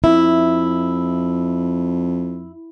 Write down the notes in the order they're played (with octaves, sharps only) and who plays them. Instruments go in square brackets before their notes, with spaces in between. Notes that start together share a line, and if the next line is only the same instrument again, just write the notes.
[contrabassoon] F2 [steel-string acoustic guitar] E4